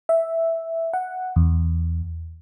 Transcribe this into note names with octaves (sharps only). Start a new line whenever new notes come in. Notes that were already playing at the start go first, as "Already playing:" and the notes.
E5
F#5
E2